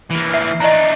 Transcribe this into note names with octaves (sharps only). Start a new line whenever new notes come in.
E3 A#3
E5 C7
D4 D#4 D#5 A#5